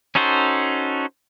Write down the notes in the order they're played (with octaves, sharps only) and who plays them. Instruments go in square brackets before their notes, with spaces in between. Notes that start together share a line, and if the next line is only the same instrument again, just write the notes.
[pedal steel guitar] C#4 D#4 F#4 A4 C5